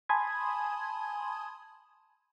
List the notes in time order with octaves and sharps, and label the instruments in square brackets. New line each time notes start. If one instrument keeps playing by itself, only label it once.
[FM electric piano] G#5 A5 B5 C6 D#6 G#6